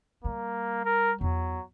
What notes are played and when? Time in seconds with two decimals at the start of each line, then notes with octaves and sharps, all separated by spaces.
0.24 G3 A#3
0.85 A#4
1.21 E2 F#3